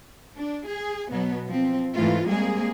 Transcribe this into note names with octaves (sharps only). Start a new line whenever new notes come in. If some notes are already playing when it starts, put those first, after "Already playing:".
D4
G#4
B2 F#3 B3
F3 C4
G#2 E3 A3 F4
G3 G#3 A#3 C4 G#4